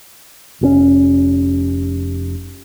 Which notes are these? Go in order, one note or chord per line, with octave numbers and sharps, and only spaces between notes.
F1 A2 C#4